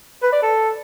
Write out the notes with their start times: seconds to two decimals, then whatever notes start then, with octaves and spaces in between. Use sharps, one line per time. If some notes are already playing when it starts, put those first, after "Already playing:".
0.22 B4
0.32 D5
0.42 A4